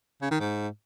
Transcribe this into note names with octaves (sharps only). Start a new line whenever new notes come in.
C#3
D#3
G#2